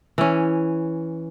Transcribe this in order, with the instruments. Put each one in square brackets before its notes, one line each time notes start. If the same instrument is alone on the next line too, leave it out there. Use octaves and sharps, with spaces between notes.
[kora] E3 C#4